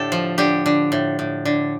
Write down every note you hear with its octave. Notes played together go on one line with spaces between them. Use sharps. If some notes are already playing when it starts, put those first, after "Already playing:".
Already playing: A2 D3 G4 A4
F3
D3 G4
D3
A2
A2
D3